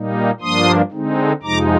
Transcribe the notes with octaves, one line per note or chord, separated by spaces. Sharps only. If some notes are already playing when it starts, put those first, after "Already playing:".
Already playing: A#2 G3 A#3 D#4
G2 F3 A#3 D4 C6 D#6
D3 G#3 C4 D#4
F2 C3 F3 G#3 D#4 A#5 D6